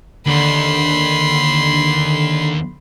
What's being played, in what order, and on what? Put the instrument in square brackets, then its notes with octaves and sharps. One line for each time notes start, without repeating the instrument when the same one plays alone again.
[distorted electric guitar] D#2 [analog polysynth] D3 [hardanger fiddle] B5 C6